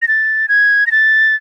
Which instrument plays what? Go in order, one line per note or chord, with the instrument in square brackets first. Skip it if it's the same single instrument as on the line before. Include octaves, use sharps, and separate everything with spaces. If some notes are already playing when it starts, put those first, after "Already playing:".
[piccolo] A#6
A6
G#6
A#6
A6